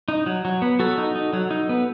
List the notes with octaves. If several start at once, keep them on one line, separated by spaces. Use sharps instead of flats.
D#4
F#3
F#3
B3
F#3 F#4 A4
D#4
D#4
F#3
D#4
B3